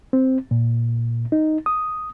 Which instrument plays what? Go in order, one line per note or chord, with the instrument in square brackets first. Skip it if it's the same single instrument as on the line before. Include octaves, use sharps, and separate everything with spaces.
[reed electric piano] C4
A#2
D#4
D#6